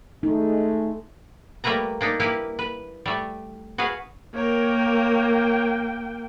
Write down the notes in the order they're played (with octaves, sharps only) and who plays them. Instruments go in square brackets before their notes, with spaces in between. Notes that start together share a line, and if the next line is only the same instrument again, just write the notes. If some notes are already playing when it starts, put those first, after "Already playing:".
[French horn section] G#3 A3 [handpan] D#4
[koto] G3 A3 A#3 B4 A#5
A#3 D4 D#4
A#3 E4 G4 B4 F5
B4
G3 A3
F#4 G#4 B4 F5
[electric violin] A#3 G5 [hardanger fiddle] A#4 C#5